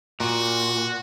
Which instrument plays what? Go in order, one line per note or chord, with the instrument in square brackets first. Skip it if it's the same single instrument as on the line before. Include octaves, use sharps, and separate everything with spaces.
[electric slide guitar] A#2 [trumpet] F#4